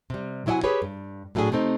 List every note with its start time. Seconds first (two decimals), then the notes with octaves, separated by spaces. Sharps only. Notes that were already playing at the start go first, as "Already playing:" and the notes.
0.10 C3 G3
0.46 C3 F#3 E4 D#5 F#5 G#5
0.64 G4 G#4 B4 C#5
0.82 G2
1.35 A2 F#3 A3 D4 G#4
1.52 C3 A3 C4 D#4